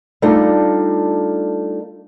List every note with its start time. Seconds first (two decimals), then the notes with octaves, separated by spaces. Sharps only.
0.22 G3 A3 D4 D#4 F4 A4